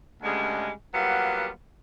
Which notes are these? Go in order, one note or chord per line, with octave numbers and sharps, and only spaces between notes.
D2 C#3 G3 G#3
F#3 G3 A#3 B3 F4 F#5